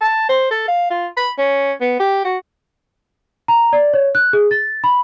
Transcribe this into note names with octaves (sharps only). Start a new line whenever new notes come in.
A5
C5
A4
F5
F4
B5
C#4
B3
G4
F#4
A#5
D5
C#5
F#6
G#4
A6
B5